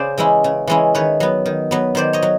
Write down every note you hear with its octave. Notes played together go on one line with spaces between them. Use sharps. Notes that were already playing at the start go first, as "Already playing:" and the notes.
Already playing: C#3 C5 D5
E3 G#3 C#4 E4
C#3
E3 G#3 C#4 E4
D#3 B4 C#5
F#3 B3
D#3
F#3 B3
D#3 C5 D5
C#5 D#5
F#3